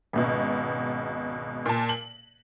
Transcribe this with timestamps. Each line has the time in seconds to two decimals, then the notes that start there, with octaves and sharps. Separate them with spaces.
0.13 G#1 C#2 B2
1.66 A#2 A5
1.89 F#7